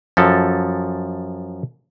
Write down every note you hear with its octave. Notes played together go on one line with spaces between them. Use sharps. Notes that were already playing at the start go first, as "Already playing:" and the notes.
F#2 F3 A4